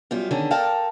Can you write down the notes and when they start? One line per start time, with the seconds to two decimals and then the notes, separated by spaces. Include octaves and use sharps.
0.11 F#2 G3 B3 F4
0.31 D3 D#3 C#4 D4 G#4 A4
0.51 A4 A#4 D5 F5 G5 A5